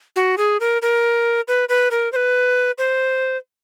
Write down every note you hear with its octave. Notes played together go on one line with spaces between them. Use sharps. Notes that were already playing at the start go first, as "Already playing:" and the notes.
F#4
G#4
A#4
A#4
B4
B4
A#4
C5
B4
C5